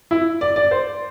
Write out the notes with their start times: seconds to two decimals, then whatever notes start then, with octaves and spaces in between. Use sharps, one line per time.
0.11 E4
0.41 D5
0.56 D5
0.71 C5